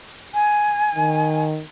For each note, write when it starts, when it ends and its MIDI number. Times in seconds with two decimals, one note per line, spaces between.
0.33 1.43 80
0.95 1.62 51